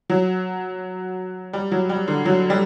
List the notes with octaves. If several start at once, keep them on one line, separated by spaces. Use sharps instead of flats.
F#3
G3
F#3
G3
D3
F#3
G3